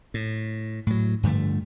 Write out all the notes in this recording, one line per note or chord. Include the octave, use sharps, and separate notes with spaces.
A2
A2 F#3
G2 D3 F3 A3